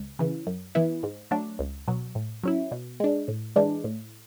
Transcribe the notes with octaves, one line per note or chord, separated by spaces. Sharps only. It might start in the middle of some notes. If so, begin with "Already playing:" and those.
Already playing: C#2
C#3 E3
F#2
E3 B3 E4
G#2
F#3 A3 D4
C#2
B2 F#3
A2
F#3 C#4 E4
B2
G#3 D4
A2
E3 G#3 D4
A2